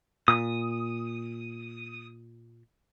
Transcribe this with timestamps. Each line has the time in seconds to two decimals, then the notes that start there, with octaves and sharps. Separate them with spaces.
0.28 A#2 D#6